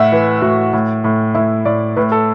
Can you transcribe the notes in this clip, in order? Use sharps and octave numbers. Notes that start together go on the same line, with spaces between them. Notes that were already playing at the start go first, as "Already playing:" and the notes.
Already playing: A2 E5 F#5
E3
A2 F#4
A2
A2
A2 E4
A2 D5
A2 B4
A4